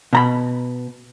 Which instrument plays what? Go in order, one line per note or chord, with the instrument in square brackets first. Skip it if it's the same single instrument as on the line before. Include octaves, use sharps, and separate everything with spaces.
[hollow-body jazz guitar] B2 A#5 B5